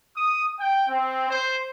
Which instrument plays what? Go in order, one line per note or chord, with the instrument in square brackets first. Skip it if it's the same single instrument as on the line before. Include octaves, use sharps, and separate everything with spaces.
[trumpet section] D#6
G5
C4
C5